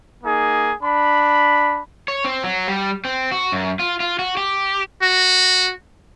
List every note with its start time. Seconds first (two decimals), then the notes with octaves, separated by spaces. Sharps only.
0.24 A#3 D#4 G#4
0.82 D4 B5
2.08 C#5
2.25 C4
2.44 F#3
2.68 G3
3.05 C4
3.32 F#4
3.52 F#2
3.79 F4
4.00 F4
4.19 F#4
4.37 G4
5.02 F#4